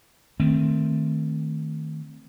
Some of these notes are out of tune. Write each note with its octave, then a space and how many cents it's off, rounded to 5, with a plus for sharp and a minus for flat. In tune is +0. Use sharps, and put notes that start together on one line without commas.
D#3 +0 A3 +10 C4 +0